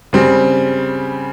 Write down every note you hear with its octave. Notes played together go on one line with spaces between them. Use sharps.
C#3 G3 C4